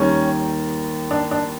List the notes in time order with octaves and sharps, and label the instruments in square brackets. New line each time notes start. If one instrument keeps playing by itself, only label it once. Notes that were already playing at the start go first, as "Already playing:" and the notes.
Already playing: [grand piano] D#2 D#3 G3 C#4
D4
D4